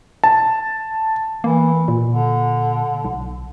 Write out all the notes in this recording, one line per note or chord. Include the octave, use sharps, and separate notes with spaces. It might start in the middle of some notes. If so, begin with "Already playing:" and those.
A5
E3 A#3
A#2
D3
B1